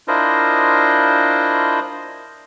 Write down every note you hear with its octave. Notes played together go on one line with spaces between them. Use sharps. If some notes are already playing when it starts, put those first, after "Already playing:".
D4 E4 F4 A#4 C5 D#5